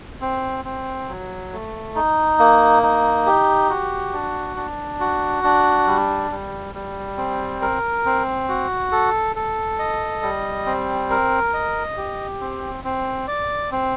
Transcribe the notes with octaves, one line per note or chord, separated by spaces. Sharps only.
C4
C4
F#3
A3
D#4
A#3
D#4
G4
F#4
D4
D4
F#4
D4
G3
G3
G3
C4
A#4
C4
F#4
A4
A4
D#5
G3
C4
A#4
D#5
G4
C4
C4
D5
C4